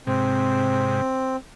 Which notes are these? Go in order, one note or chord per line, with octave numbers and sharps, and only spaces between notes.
G#2 C3 C4